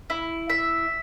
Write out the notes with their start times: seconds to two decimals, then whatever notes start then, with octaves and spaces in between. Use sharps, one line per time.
0.10 E4
0.50 E5